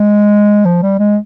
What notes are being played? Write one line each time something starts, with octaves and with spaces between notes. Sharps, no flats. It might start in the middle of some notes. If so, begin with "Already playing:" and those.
Already playing: G#3
F3
G3
G#3